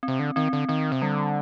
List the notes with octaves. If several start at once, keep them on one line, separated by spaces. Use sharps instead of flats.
C4
C3
D3
D#3 C4
D3
D#3 C4
C3
D3 G3